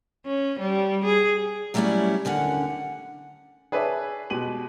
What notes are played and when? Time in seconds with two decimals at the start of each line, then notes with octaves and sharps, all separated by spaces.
0.25 C#4
0.59 G3
1.05 G#4
1.74 F#3 G3 A3 C#4 E4 D5
2.25 D#2 D3 C#4 F#5
3.72 G#4 B4 C#5 D5 E5 A5
4.30 B2 G#3 G4 D#7 F#7